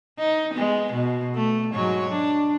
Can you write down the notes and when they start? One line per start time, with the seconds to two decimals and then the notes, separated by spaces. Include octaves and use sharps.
0.18 D#4
0.54 G#3 B3
0.92 B2
1.35 A3
1.74 G#2 F#3 C#5
2.10 D4